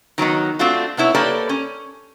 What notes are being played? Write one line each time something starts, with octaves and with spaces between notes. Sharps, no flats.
D#3 F#3 B3 D#4
A3 C4 D4 F4 F#4
C3 B3 E4 C#5
A#3 G4 A4 B4 C#5 D5
C#4